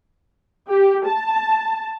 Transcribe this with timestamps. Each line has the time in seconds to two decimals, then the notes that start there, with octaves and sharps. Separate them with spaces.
0.70 G4
1.06 A5